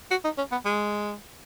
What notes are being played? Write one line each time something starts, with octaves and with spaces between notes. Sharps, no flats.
F#4
D#4
C#4
B3
G#3